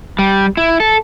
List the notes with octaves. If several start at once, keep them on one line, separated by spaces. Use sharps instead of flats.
G3
E4
A4